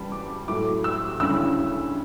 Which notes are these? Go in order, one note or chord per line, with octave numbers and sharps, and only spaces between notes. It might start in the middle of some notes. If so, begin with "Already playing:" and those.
Already playing: F#2 C#3 E3 G3 A5 B5
D6
A2 F#3 A3 E4 D6
E6
D2 C#3 G3 C#4 E4 E6